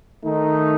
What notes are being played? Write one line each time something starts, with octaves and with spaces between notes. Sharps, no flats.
D#3 A3 D#4